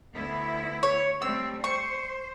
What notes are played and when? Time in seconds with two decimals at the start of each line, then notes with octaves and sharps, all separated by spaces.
0.15 D2 B3 E4
0.83 C#5
1.22 G3 A3 C4 E6
1.64 C5 C#6